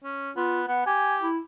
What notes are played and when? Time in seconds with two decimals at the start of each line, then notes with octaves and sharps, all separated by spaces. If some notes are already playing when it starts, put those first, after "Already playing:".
0.03 C#4
0.36 B3 F4
0.68 B3 F#5
0.86 G4 G#5
1.22 E4